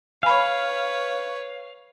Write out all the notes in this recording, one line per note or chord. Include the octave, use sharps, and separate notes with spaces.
B4 C#5 F5 G#5 B5